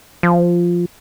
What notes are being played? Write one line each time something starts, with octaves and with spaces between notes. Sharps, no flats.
F3